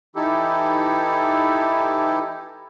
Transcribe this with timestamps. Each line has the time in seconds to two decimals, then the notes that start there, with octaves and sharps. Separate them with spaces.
0.16 E3 D#4 E4 G4 A4